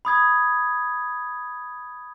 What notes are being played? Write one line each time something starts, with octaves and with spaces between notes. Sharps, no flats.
B5 D#6 G#6